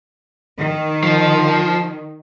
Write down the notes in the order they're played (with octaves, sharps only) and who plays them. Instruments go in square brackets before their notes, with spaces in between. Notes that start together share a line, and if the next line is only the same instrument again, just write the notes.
[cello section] D#3
[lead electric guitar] F3